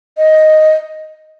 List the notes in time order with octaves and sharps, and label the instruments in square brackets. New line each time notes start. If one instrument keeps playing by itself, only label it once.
[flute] D#5